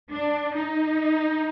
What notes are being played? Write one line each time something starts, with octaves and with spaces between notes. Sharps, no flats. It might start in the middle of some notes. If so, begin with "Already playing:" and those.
D4
D#4